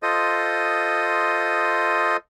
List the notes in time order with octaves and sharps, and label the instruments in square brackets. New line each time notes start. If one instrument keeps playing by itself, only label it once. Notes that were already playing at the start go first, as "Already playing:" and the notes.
[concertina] F4 A4 C5 D#5 D#6